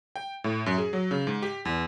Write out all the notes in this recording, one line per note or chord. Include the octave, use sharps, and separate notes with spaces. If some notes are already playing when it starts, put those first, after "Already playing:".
G5
A2
F#2
G#4
F#3
C#3
G#2
G4
E2